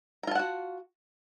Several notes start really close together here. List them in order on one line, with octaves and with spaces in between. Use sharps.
A#5 F4 A5 F#5 F#4